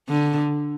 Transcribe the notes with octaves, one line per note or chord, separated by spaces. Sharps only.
D3